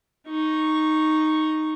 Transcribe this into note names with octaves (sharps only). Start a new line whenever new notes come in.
D#4 C#6